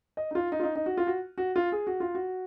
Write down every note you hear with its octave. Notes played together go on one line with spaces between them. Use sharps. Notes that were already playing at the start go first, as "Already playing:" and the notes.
D#5
D#4
F4
D#4
F4
D#4
D#4
F#4
F4
F#4
F#4
F4
G#4
F#4
F4
F#4